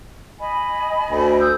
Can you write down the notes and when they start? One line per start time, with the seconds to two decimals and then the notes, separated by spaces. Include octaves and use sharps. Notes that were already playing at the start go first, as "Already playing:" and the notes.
0.40 D#5 G#5 B5
1.11 D2
1.40 D#6 E6 G6